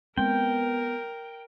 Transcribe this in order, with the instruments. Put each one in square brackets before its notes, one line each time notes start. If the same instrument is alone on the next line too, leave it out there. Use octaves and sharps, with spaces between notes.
[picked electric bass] G#3 C4 [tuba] B3 [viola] A#4 [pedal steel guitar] G5